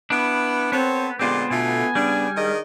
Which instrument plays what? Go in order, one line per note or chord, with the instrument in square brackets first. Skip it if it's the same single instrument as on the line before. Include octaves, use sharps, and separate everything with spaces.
[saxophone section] B3 [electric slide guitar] D4 [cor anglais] E4
[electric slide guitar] B3 [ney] C4 [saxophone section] A4 C5 C#5
[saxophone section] A#2 D3 G#3 [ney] B3 [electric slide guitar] C4 F4 [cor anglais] G4
[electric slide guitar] B2 [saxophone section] D3 A3 F4 [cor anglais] G#5
[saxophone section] C#3 D4 [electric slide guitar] G3
[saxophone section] D#3 D4 D#5 [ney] G#4